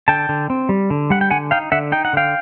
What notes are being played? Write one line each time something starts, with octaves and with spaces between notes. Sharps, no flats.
D3 G5 A5
D3
C4
G3
D3
G3 F#5
G5
D3 F#5 G#5
D#4 F5 G5
D3 E5 F#5
D#4 G5
F#5
D3 F5 G5